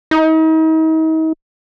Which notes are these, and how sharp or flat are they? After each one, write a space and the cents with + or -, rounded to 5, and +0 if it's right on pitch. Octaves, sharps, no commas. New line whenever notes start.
D#4 +40